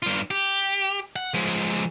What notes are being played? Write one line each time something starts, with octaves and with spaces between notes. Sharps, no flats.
G2 F4
G4
F#5
F3 G#3